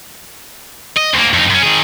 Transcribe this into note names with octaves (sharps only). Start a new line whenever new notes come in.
D#5
D2 A#3
F2 D#4
F#2 C#4
D#3 G#4